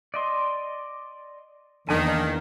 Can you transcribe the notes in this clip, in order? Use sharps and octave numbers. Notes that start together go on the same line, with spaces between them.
D5 D#5 C6
E2 D#3 A#3 D4 G#5